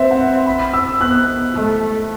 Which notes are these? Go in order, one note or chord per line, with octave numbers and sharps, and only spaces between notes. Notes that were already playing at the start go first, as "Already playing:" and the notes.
Already playing: C4 B4 C5 E5
F#5
B5
E6
B3 F#6
A3